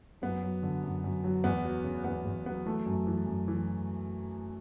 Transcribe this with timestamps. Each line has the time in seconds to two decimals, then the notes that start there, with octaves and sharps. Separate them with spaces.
0.22 F#2 B3
0.43 F#3
0.63 D3
0.84 F#2
1.04 F#2
1.24 F#3
1.44 E2 B3
1.65 F#3
1.84 C#3
2.04 E2 B3
2.25 E2
2.46 F#3 B3
2.66 E3 A3
2.86 F#2
3.07 E3
3.26 F#2
3.48 E3